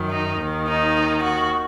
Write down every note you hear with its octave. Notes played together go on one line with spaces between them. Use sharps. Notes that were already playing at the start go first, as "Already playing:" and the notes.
Already playing: F#2 D#3
D#4
D#2 D#3
D#4
F#4